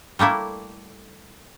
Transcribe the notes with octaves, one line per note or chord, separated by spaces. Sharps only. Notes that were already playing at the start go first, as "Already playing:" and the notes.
G3 A3 A#3 E4